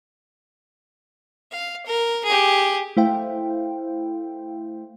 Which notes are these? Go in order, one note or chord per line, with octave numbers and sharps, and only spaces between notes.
F5
A#4
G4 G#4
A3 E4 C5 F5 G5